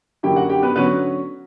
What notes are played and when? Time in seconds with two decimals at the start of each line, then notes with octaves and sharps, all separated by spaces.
0.23 F#2 D3 F#3 A#3 E4 G4 G5
0.36 F#4 F#5
0.49 G4 G5
0.63 B3 B4
0.76 D3 F#3 B3 C#4 B4